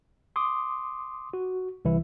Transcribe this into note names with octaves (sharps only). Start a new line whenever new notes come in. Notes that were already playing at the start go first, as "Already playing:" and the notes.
C6 D6 D#6
F#4
C2 E3 E4